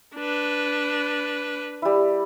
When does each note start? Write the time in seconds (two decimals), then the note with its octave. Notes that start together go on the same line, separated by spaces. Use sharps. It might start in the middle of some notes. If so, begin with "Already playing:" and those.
0.15 D4 B4
1.82 G3 E4